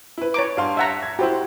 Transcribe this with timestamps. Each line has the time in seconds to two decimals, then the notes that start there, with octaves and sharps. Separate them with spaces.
0.18 E4 B4
0.34 C#5 A#5 D6
0.57 G2 F5 C6
0.77 E5 F#5 A#5
1.03 G#6
1.19 E4 F#4 G4 C5